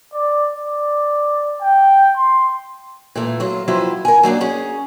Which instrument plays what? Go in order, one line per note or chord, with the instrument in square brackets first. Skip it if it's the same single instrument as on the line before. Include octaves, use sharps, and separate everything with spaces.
[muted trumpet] D5
D5
G5
C6
[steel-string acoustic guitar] A#2 E3 A3
F#3 F4
F2 F3 F#3 E4 B4 C5
A#4 G#5
F#3 A#3 C4 D4
C#4 G#4